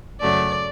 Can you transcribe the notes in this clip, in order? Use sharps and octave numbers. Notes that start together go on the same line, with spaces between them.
F#2 C#3 F#3 A3 D5